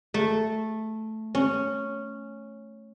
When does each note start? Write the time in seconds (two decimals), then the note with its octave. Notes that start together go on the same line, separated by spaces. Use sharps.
0.14 A3
1.35 C#4